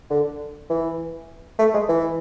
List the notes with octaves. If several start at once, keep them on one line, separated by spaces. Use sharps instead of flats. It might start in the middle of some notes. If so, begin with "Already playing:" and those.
D3
E3
A3
G#3
E3